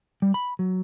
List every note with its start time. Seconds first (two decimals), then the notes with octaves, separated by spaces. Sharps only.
0.22 G3
0.34 B5
0.59 F#3